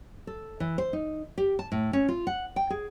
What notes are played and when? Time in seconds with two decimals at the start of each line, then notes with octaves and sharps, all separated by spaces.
0.27 A4
0.60 E3
0.78 C5
0.93 D#4
1.38 G4
1.59 A5
1.72 A2
1.93 C#4
2.08 F4
2.27 F#5
2.56 G5
2.70 G#4